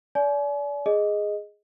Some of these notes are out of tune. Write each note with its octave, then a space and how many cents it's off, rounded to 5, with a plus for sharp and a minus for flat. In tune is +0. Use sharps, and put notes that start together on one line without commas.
D5 -30 G#5 +40
G#4 +0 D#5 +0